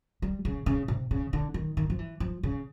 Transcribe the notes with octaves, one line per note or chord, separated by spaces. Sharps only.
G3
C#3
C#3
C3
C#3
D3
D#3
D#3
F3
E3
F3
C#3